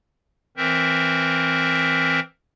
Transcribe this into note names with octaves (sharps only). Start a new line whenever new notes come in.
E3 C4 A#4 C5 E5